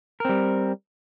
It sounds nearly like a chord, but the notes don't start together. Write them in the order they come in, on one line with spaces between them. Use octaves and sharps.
A#4 C4 G3